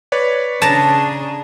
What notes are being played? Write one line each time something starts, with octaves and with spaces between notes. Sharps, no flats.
B4 C#5 D5
C#3 D4 G#4 A5 A#5